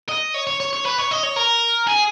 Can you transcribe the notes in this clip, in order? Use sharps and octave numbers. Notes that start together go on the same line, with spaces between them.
D#5
C#5
C#5
C#5
C#5
B4
C#5
D#5
C#5
A#4
G#4